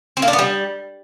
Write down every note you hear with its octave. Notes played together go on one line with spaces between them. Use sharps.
C4
A#3
D4
B3
G3